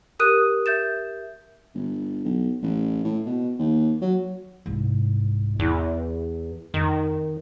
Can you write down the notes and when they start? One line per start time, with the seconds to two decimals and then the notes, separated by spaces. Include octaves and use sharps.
0.19 G4 A#4 D#6 F#6 D#7
0.66 E5 G6 A6 E7
1.75 G1
2.25 B1
2.62 A1
3.04 A2
3.26 B2
3.59 D#2
4.01 F#3
4.66 C2 G#2
5.59 E2 E4
6.74 F2 D#3